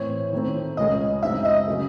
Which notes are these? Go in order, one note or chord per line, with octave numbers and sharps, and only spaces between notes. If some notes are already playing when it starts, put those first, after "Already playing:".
Already playing: A2 E3 C4 C#5
D#3 A3 C4
C#2 C#3 G#3 C#4 G#4 D#5
F#2 C#3 G#3 C4 D#4 E5
D#5
C#3 F#3 C#4 G#4